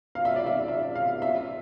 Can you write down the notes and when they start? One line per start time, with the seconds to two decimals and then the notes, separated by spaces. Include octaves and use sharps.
0.15 F5
0.25 E5
0.36 D5
0.46 E5
0.68 E5
0.96 F5
1.22 E5